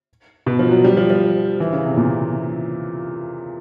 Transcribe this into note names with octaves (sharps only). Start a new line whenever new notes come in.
B2
F3
F#3
G3
F3
F3
E3
C#3
C3
A#2